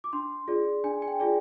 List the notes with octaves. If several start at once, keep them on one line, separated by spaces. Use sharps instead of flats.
D6
D4 C6
F4 G#4 D5
D4 G#5
G#5
G5
F4 G#4 D5